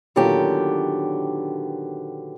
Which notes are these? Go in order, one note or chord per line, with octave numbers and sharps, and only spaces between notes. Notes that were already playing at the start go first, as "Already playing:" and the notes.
A#2 D3 D#3 F#3 B3 G4